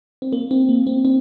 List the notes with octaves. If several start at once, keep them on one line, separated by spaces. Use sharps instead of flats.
C4
A#3
C4
A#3
C4
C4